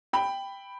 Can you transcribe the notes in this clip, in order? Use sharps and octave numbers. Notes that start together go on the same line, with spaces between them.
G5 B5